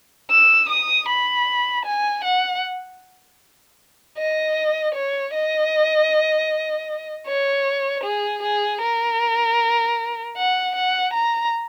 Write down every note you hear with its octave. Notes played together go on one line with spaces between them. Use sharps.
E6
D#6
B5
G#5
F#5
D#5
C#5
D#5
C#5
G#4
G#4
A#4
F#5
F#5
A#5